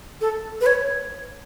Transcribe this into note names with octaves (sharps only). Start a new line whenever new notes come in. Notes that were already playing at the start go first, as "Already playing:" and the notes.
A4
B4
C#5